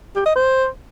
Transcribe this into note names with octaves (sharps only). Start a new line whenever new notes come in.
G4
D#5
C5